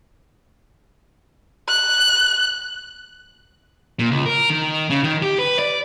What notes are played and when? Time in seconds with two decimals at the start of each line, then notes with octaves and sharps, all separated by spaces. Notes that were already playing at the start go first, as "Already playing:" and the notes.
1.68 F#6
3.99 A#2
4.11 C#2
4.26 A#4
4.50 D#3
4.90 C#3
5.04 D#3
5.22 G4
5.39 B4
5.59 D5